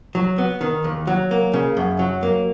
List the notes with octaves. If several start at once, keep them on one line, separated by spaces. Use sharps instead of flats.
F#3
B3
D#3
D#2
F#3
A#3
C#3
F#2
F#3
A#3